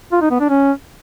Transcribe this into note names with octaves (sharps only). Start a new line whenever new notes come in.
F4
D#4
B3
D4
C#4